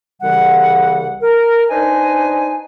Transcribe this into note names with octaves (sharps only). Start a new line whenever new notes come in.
C2 C#3 E3 G3 F#5
A#4
D4 D#4 B4 C5 D#5 G#5